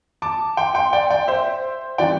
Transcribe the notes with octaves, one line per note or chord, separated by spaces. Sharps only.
A5 D6
G5 C6
G5 C6
D5 G5
D5 G5
C5 E5
E3 G3 C4 D5 G5